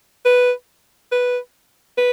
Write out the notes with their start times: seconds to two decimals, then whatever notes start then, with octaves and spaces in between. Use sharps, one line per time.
0.25 B4
1.12 B4
1.97 B4